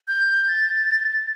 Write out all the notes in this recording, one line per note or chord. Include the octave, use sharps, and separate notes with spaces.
G6
A6